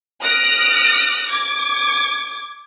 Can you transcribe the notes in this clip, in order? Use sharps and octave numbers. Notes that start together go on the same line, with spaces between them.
D#6 F6 F#6 A#6 D7
D6 G#6